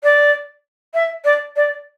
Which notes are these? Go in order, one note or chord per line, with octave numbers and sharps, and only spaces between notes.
D5
E5
D5
D5